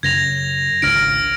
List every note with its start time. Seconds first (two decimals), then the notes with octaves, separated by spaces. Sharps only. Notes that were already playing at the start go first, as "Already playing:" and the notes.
0.03 F#2 C#3 G#6 A#6 F7
0.82 G#1 C#2 D4 F6 A#6 D7